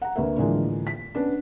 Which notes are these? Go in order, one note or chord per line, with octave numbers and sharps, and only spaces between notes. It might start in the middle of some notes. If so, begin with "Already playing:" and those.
F#5 A#5
D2 A#3 B4 E5
A2 D3 E3 F3 G#3 A#3
B6
B3 C#4 D4